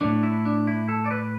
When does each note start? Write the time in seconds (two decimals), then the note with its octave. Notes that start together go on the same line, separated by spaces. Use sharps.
0.01 A2 A3 D4
0.23 E4
0.45 D4
0.67 E4
0.89 A4
1.06 D5
1.11 B4